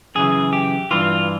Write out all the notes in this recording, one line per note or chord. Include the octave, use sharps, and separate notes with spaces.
F#2 C#3 E3 G#4
G4
G2 E3 F4